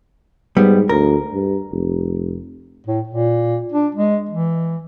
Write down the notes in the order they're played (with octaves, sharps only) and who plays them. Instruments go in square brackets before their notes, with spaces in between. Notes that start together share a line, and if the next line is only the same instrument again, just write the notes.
[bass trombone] G#2 [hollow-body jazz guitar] G3 B3
[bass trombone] D2 [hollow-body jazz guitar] A#4
[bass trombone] G2
F1
[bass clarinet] A2
A#2
D4
G#3
E3